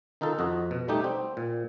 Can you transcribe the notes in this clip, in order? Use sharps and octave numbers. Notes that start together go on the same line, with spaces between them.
D#3 D#4 F4 A4
F2 F#4 D#5
B2
G3 A3 D#4 G4
C4
A#2